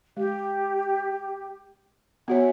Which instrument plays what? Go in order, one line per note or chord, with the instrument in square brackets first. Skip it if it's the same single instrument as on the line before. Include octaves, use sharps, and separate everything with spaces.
[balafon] G#3 [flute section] G4
[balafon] B3 F#4 C#5 [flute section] E5 F#5 G#5